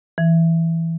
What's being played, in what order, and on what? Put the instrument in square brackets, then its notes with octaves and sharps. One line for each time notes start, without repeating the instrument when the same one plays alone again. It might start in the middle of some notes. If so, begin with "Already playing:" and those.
[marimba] E3